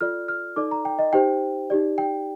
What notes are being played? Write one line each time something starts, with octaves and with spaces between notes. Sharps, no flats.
F4 A4 D5 F6
F6
D#4 A4 D5 D6
A#5
G5
D#5
D#4 G4 C5 G5
D#4 G4 D5
G5